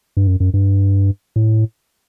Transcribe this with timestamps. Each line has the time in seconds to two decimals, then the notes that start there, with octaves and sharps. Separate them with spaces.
0.17 G2
0.27 F#2
0.40 F#2
0.54 G2
1.36 A2